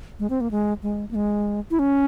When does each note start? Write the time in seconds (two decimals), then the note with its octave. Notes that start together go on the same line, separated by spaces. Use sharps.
0.20 G#3
0.30 C4
0.41 A#3
0.51 G#3
0.83 G#3
1.11 A#3
1.15 G#3
1.71 E4
1.79 C#4